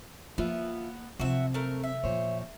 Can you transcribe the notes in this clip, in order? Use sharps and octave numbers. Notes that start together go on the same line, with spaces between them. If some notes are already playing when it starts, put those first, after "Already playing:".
F3 A#3 B3 F4 E5
C3 F3 F#3 C4 F#4 E5
A3 A#4
E5
A#2 F3 C5 C#5